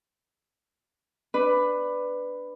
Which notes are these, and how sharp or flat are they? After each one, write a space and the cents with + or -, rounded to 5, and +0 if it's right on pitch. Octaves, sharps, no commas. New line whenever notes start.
D4 +10 B4 +10